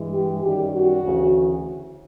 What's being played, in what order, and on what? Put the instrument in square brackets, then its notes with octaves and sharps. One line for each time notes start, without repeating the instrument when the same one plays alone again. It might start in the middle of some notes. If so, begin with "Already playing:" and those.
Already playing: [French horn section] G2 E3 G#3
G4
F#2 D#3 G3 G4
F#4
D2 C#3 E3